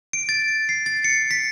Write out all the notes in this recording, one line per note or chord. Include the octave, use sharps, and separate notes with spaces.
D7
A6
C7
A6
C#7
B6